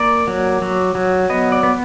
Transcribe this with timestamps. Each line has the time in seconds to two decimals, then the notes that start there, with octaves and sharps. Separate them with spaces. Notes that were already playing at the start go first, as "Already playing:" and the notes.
Already playing: A#3 D5
0.27 F#3
0.62 F#3
0.95 F#3
1.30 B3 D#5
1.52 D5
1.63 B3